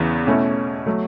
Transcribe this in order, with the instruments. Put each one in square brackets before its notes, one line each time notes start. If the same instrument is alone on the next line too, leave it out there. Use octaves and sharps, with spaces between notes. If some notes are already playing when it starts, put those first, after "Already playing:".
Already playing: [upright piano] E2 C#3 E3 B3
B2 A3 C#4 E4
F#3 A3